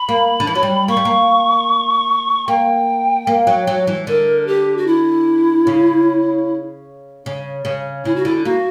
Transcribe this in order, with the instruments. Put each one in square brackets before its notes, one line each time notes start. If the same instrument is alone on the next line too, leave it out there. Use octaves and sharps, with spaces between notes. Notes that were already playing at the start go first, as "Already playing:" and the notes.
Already playing: [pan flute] B5
[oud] A#3
D3
E3
F#3
G3
[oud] A#3 [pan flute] C#6
[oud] G3
A#3
[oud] A#3 [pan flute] G5
[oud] A#3
F#3
F#3
E3
[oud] D3 [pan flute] A#4
[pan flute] G4
F#4
E4
[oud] C#3
C#3
C#3
[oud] C#3 [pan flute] E4
[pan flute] F#4
[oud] D3 [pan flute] E4
[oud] A#3 [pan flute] F#4